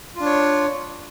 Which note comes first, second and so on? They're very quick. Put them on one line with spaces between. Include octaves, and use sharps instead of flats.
F4 D4 C#5